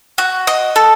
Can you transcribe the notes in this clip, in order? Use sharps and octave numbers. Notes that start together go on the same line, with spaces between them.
F#4
D#5
A4